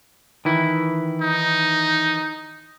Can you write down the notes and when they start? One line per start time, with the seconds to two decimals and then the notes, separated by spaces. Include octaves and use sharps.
0.45 D#3 E3 E4
1.22 D#4